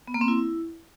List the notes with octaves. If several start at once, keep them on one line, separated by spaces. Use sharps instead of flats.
B3
A#3
C4
E4